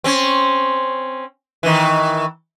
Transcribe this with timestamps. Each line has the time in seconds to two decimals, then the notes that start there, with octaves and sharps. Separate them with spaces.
0.04 C4 C#4
1.63 D#3 E3